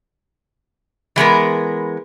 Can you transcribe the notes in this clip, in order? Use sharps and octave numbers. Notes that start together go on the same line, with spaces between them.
E3 G#3 B3 A#4